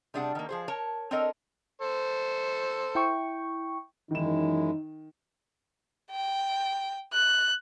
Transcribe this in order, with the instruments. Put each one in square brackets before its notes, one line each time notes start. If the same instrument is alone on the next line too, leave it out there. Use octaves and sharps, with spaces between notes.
[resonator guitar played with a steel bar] C3 G3 D4 G#4 F#5
D#3 A#3
F3 G#4 C5
A#4 C#5 A5
C4 D4 A4 A#4 C#5 D#5
[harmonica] A4 C5
[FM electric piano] E4 G5 C#6
[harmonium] F#2 G#3 E4 [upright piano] D#3 E7 [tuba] E3 [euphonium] D#4
[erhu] G5
F#6